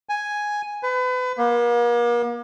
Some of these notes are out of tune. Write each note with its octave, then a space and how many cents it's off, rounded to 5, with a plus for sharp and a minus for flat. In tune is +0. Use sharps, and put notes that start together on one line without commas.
G#5 +0
B4 +35
A#3 +40